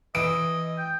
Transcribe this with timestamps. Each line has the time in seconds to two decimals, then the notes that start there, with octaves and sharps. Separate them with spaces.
0.15 E3 D#5 D7
0.78 G5